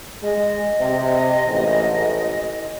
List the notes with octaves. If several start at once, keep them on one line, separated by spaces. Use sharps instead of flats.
G#3 D#5
C3
A1 G#2